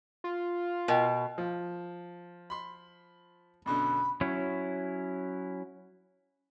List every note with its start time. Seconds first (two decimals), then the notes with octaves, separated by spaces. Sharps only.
0.24 F4
0.88 B2 A#4 D#5 G5
1.38 F3
2.50 B5 C6
3.66 F#2 B2 D3 B5
4.21 F#3 C#4 E4